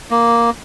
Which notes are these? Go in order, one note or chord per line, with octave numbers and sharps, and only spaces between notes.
A#3